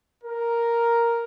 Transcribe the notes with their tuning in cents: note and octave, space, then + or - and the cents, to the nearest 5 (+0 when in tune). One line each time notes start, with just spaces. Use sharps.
A#4 +0